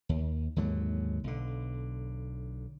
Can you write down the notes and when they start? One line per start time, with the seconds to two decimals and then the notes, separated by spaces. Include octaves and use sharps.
0.09 D#2
0.56 D#2 G#2 D3 F#3
1.24 B1 D3